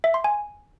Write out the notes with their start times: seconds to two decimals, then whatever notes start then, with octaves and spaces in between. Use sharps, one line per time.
0.04 E5
0.14 C6
0.24 G#5